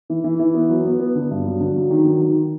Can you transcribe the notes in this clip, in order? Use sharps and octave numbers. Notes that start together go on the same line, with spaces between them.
E3
E3
E3
B3
F#3
B3
B3
D3
G2
F#3
D3
F#3
D#3
F#3
D#3